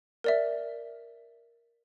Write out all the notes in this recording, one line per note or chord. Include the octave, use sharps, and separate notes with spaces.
A#4 D5 E5